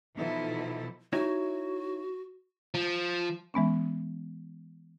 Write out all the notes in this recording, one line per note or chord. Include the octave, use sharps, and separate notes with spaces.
B2 E3 F3 D#4 E4 A4
D#4 E4 F#4 C#5
F3
E3 G#3 B3 C#4